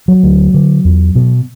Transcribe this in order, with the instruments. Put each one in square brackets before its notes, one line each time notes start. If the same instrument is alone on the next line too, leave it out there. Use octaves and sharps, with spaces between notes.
[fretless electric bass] F#3
D2
D3
E2
B2